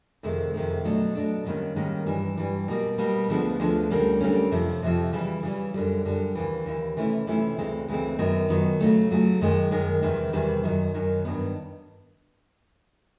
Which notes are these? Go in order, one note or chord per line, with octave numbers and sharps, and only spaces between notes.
F2 C3 D#3 G#3
F2 C3 D#3 G#3
B2 F#3 A3 D4
B2 F#3 A3 D4
G#2 D#3 G3 A#3 C#4
G#2 D#3 G3 A#3 C#4
G2 E3 G3
G2 E3 G3
B2 G3 A#3
B2 G3 A#3
D2 D3 F3 G#3 B3
D2 D3 F3 G#3 B3
D2 D3 G3 A#3 C#4
D2 D3 G3 A#3 C#4
F2 C3 F3
F2 C3 F3
C#3 E3 G3
C#3 E3 G3
F#2 D3 G3
F#2 D3 G3
D#2 C#3 E3
D#2 C#3 E3
C3 E3 A3 C#4 E4
C3 E3 A3 C#4 E4
D2 C#3 E3 G#3 C4
D2 C#3 E3 G#3 C4
F#2 D#3 F#3 B3
F#2 D#3 F#3 B3
C#3 F#3 A3
C#3 F#3 A3
F#2 D#3 G#3
F#2 D#3 G#3
E2 C3 D#3 G3
E2 C3 D#3 G3
F#2 D#3 F#3
F#2 D#3 F#3
G2 D#3 F#3 B3